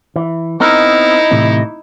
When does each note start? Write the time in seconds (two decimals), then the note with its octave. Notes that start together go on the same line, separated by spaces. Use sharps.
0.16 E3
0.60 B3 C4 D#4 E4 A#4 D#5
1.31 A2 C3 E3